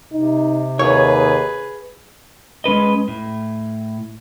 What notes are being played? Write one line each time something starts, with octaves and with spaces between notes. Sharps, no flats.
C3 D#4
D#2 G#4 B4 C#5
G#3 C#4 B4 D#5
A2